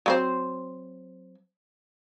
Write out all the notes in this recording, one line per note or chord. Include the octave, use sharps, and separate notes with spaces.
F#3 C4 C5